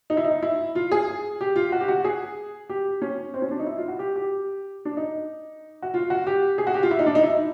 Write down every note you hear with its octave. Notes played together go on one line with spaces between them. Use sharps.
D#4
E4
D#4
E4
F4
G#4
G4
F4
F#4
G4
F#4
G#4
G4
C#4
C4
C#4
D4
D#4
E4
F4
F#4
G4
G4
D4
D#4
F#4
F4
F#4
G4
G#4
F#4
G4
F4
E4
D#4
D4
D#4
E4